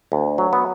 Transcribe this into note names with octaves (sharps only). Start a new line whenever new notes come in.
D2
F#3
B3